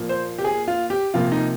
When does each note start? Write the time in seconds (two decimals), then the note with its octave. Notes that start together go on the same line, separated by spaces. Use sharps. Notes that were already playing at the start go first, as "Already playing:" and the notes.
Already playing: A#2 F3 A#3
0.09 C5
0.39 G4
0.44 G#4
0.68 F4
0.90 G4
1.14 C3 F3 A#3 F4
1.32 D#4